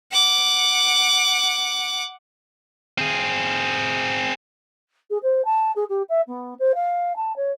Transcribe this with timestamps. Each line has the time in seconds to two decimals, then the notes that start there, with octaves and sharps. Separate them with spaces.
0.12 F#5 D6
2.98 C4 G#4
5.10 G#4
5.23 C5
5.45 A5
5.76 G#4
5.90 G4
6.09 E5
6.28 B3
6.59 C5
6.75 F5
7.17 A5
7.36 C#5